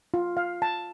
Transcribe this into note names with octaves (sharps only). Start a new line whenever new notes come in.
F4
F5
A5